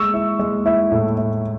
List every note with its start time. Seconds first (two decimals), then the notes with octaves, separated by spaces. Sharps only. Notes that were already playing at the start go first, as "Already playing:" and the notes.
Already playing: G#3 C#6 E6
0.14 E4
0.39 G#3
0.66 E4
0.92 A2
1.17 E4